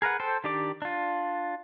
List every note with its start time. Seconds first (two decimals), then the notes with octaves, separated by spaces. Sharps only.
0.02 G#4 A#4 B4 F#5
0.20 A4 C5 G5
0.44 D#3 D4 G4 D5 D6
0.82 D4 F4